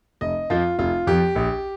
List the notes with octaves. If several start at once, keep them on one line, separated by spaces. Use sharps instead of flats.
F1 D#5
F2 F3 F4
F1 F4
F2 F3 G4
A#1